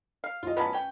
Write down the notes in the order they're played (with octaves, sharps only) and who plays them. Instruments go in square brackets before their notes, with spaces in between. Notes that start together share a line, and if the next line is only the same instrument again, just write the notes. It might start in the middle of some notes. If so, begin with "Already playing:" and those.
[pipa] F5
[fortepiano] F4 D#5
[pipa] F#3 B3 C#4 [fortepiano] B4 A5
[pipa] C#4 G5